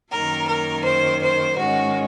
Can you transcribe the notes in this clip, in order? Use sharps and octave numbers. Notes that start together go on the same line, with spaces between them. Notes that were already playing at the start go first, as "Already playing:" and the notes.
F#2 D#3 A#3 A#4
A#4
C5
C5
G#2 D#3 G#3 C#4 F#4